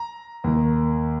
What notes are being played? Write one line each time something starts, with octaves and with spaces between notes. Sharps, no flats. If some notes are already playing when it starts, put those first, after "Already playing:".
Already playing: A#5
D#2 D#3